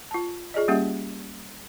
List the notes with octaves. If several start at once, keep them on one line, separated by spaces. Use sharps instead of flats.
F4 A5
F4 G#4 D5 D#5
G3 A#3 C#4 G4 E5 F#5